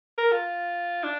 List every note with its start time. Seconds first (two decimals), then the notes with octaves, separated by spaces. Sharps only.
0.18 A#4
0.32 F4
1.04 D4